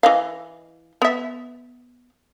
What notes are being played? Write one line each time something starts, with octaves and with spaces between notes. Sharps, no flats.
E3 D#5 F5
B3 E5